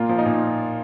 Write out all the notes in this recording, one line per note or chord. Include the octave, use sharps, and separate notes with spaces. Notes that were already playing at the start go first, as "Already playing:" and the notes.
Already playing: A#2 A#3 F4
F3
D#4
A#2